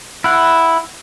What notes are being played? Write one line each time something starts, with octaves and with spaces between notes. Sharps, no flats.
E4 F#5